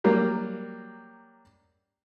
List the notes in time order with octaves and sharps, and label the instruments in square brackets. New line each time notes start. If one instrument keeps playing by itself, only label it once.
[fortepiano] F#3 G3 A#3